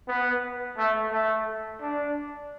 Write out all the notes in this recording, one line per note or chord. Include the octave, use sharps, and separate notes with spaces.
B3
A3
A3
D4